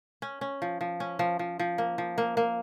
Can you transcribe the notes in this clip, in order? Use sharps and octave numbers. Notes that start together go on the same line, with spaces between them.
C#4
C#4
F3
F3
C#4
F3
F3
F3
A#3
F3
A#3
A#3